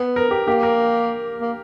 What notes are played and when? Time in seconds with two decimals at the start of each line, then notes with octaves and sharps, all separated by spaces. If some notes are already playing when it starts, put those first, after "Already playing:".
Already playing: B3
0.16 A#4
0.31 G4
0.47 A#3 G4
0.63 A#4
1.41 A#3